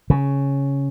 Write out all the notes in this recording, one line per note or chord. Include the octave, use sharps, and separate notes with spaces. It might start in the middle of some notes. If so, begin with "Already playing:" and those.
C#3